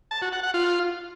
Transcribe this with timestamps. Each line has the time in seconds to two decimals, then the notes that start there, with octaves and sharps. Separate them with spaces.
0.11 A5
0.22 F#4
0.32 F#5
0.43 F#5
0.54 F4